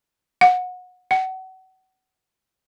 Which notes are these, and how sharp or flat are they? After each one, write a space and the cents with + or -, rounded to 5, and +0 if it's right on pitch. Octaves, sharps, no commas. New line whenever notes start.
F#5 -25
F#5 +30